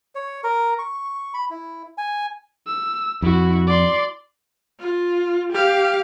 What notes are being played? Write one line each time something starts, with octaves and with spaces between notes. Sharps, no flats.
C#5
A#4
C#6
B5
E4
G#5
E6
F2 E4 F#4
D5 C6
F4
G4 F5